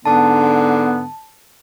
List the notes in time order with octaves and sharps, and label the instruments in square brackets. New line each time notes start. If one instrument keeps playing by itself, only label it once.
[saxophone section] G#2 D3 [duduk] B3 [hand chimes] A5